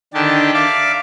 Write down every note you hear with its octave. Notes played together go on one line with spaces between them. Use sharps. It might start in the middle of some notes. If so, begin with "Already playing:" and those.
D3 D#3 D4 G4 A5
D5 E5 F5 D6